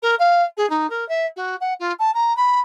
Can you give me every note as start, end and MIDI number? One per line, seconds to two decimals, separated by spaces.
0.02 0.15 70
0.19 0.43 77
0.57 0.68 68
0.70 0.87 63
0.90 1.07 70
1.08 1.26 76
1.36 1.56 66
1.61 1.74 78
1.79 1.93 65
1.99 2.13 81
2.14 2.36 82
2.36 2.60 83